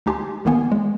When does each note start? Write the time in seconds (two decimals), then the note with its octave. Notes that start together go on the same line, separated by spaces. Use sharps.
0.06 D2 D#4 G4 G#5 A5 C6
0.45 A1 D#3 A#3 B3 G#5
0.72 G#3